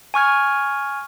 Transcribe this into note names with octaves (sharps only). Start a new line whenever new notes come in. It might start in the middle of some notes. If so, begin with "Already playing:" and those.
G#5 C#6 F6 G#6